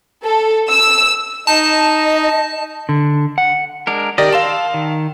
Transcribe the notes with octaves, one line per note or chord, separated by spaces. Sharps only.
A4
E6
D#4 D#5 A5
D3
F#5
G#3 D4 A#4
D#3 G4 A#4 D5 D#5
F5 A5 C6 E6 E7
D#3